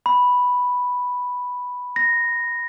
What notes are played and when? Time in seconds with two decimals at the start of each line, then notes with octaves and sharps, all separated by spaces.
0.06 B5
1.96 A#6